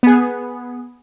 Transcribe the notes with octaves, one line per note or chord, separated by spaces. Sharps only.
B3 G#4